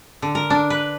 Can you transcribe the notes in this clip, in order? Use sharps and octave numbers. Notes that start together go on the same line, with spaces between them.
D3
A#4
D4
B4